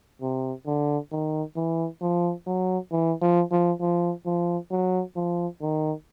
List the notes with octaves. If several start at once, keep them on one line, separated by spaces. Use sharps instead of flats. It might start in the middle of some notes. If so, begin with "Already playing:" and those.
C3
D3
D#3
E3
F3
F#3
E3
F3
F3
F3
F3
F#3
F3
D#3